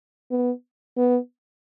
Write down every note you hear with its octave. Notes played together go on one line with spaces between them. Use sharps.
B3
B3